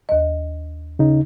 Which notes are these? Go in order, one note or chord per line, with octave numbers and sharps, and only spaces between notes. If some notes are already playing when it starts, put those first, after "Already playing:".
D#2 D#5
C#3 D#4